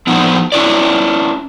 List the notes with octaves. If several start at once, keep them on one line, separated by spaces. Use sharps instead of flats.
F3 B3 C4 D#4
C#4 E4 C#5 D5